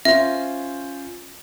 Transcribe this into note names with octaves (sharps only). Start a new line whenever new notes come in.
C#4 F4 C5 E5